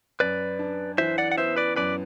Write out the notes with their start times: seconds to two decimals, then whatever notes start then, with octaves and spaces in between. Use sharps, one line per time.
0.20 F#2 B4 D5
0.59 D4
0.98 E3 C5 E5
1.18 D5 F#5
1.32 F#5
1.37 B3 C5 E5
1.56 B4 D5
1.76 F#2 B4 D5